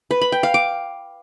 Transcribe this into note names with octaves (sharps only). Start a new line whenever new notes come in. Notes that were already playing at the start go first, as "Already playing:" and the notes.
B4
B5
G5
F5
D6